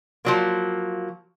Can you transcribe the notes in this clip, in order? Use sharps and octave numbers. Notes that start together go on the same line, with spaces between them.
F3 F#3 A#3